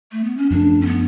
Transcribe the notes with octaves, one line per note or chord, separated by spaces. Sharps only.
A3
B3
C#4
F#2 F3 A3 D4
C#4
B3